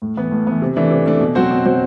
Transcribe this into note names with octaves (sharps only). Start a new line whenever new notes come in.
A2
E3 B3
A2
E3 B3
C3
E3 A3 D4
C3
E3 A3 D4
B2
F#3 C4 F#4 C5
B2
F#3 C4 F#4 C5